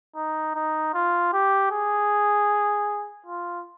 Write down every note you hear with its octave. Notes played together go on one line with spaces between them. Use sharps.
D#4
D#4
F4
G4
G#4
F4